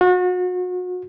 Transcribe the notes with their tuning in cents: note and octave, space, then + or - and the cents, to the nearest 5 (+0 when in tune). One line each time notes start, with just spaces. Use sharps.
F#4 -35